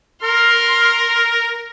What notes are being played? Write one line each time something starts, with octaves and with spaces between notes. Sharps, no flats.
A#4 C6 F6